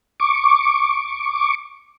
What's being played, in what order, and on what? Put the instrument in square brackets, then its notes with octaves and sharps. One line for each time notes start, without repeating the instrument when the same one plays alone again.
[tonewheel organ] C#6 D6